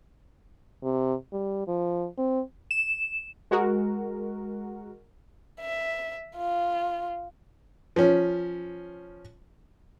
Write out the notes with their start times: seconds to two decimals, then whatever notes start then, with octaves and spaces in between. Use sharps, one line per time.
0.83 C3
1.33 G3
1.68 F3
2.18 C4
2.71 E7
3.51 G#3 F#4 A#4
5.61 E5
6.36 F4
7.96 F3 C#4